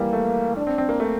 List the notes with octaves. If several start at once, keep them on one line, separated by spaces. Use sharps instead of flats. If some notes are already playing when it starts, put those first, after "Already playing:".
Already playing: E3 G3 A#3
A3
D4
C4
C4
A#3
A3